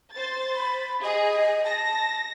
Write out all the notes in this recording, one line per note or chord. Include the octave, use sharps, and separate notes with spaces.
C5 A6
B5
G#4 D#5
A5 A#6